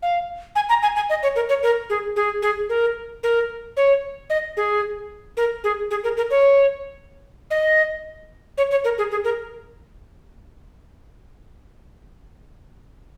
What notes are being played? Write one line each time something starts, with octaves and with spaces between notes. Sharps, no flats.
F5
G#5
A#5
G#5
G#5
D#5
C#5
A#4
C#5
A#4
G#4
G#4
G#4
A#4
A#4
C#5
D#5
G#4
A#4
G#4
G#4
A#4
A#4
C#5
D#5
C#5
C#5
A#4
G#4
G#4
A#4